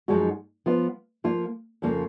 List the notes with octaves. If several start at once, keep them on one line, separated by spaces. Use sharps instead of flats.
F#2 F3 G#3 D#4 F#4
F3 B3 F4
F3 A#3 F4
F2 C#3 F3 A#3